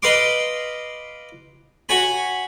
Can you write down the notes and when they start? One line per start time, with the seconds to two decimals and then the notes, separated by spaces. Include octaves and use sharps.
0.03 B4 D#5 F5 C6 D6
1.89 F#4 C#5 G#5 B5